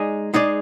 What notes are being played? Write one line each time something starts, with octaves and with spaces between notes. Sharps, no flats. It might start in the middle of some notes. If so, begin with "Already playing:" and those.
Already playing: G#3 D#4 G#4 D5
G#3 D#4 G#4 D5